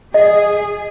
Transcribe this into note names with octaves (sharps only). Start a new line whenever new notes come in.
G#4 D#5